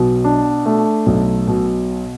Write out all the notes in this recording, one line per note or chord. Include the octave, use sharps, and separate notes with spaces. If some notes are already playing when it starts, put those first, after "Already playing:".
Already playing: B1 B2
D4
A3
B1
B2